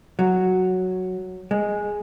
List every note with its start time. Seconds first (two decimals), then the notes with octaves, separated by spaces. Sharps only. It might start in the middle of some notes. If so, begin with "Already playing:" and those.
0.19 F#3
1.51 G#3